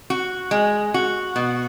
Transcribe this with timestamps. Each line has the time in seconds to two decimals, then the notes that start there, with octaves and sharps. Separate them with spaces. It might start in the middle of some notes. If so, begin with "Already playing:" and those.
0.10 F#4
0.51 G#3
0.94 F#4
1.36 B2